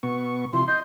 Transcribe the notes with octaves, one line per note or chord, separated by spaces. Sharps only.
B2 B3 C#6
C3 F3 E4 C6
D#5 C6 G6